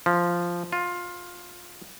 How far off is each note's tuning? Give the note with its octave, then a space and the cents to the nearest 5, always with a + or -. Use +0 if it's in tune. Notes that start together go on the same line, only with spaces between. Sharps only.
F3 -5
F4 +15